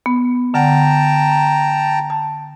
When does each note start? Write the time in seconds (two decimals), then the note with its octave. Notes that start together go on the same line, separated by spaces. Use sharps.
0.06 B3
0.54 D3 F#5 G5 A5 A#5
2.10 A5